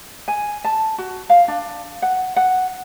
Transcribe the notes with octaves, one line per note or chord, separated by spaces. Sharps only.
G#5
A5
F#4
F5
D4
F#5
F#5